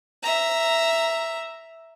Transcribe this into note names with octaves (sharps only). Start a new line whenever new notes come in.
E5 A#5